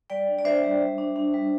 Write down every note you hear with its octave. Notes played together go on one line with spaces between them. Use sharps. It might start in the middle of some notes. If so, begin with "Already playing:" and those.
G3 D5 G5
D4
D5
D4 C5 E5
G3
G3
D4
D4
G3